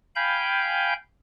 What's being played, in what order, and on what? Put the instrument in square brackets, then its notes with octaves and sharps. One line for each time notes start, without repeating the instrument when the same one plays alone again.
[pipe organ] F5 G5 G#5 B5 G6